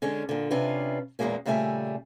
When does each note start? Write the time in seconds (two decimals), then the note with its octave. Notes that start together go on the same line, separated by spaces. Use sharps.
0.02 D3 G#3 C#4
0.29 A#2 D3
0.51 C3 C#4 D4 F4 B4
1.19 E2 A#2 D#3 G#3 A#3 C#4
1.46 A#2 C#3 G3 A3 E5 G#5